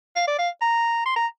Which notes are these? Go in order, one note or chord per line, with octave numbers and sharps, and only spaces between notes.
F5
D5
F5
A#5
C6
A#5